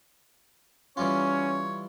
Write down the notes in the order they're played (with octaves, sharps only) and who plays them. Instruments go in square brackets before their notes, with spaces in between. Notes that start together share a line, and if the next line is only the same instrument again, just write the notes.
[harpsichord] E3 G3 F4 [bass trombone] C#4 [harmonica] C#5